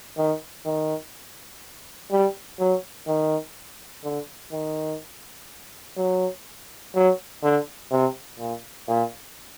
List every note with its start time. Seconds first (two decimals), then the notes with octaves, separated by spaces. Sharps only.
0.17 D#3
0.65 D#3
2.11 G3
2.59 F#3
3.07 D#3
4.04 D3
4.52 D#3
5.97 F#3
6.95 F#3
7.43 D3
7.91 C3
8.39 A#2
8.88 A#2